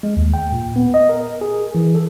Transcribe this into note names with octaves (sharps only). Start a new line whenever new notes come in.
G#3
D#2
G5
A#2
B3
D#5
A#4
G#4
E3
A4